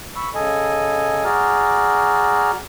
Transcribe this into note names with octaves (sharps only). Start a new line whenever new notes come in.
B5 C#6 E6
C#3 A4 D#5 G#5
F#4 G#4 D5 A#5 F6